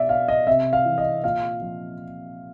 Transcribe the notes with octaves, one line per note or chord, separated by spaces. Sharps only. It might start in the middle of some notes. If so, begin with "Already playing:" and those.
Already playing: B2 D5 E5
F5
D#5
C3 E5
F5
E3
D#5
A#2 F5
F3